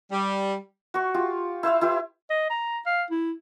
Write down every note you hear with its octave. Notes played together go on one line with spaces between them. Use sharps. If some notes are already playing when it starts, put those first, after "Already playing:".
G3
F#4 C#6
F4 G4
E4 C5 E5 F5
E4 F4 G4 B4
D#5
A#5
F5
E4